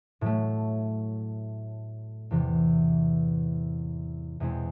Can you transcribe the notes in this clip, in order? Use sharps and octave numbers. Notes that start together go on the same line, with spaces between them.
A2 F#3 A3
E2 C3 E3
E2 B2 G#3 C4 E4